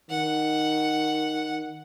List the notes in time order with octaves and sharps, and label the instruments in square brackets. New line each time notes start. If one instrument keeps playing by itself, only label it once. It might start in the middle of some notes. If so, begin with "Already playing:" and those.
[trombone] D#3 [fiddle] F#5